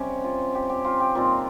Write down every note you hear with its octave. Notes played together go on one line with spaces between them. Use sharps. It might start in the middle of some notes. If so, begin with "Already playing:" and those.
Already playing: C3 G3 C#4 D#4 G4
F4
G4
G4
F4
G4
A#2 G3 C4 D#4 F4